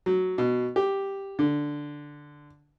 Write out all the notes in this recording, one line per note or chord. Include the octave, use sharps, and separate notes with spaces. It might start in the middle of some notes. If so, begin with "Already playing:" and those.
F#3
B2
G4
D3